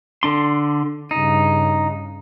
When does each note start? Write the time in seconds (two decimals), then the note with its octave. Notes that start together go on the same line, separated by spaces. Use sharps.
0.23 D3 D4 C6
1.11 G2 C#3 D#4